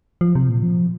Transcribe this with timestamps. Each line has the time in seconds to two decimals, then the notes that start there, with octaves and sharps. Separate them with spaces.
0.21 F3
0.35 C3
0.49 A#2
0.63 F3